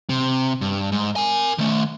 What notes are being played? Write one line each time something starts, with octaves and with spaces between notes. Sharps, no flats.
C3
G2
G#2
A#4 G#5
D#3 A3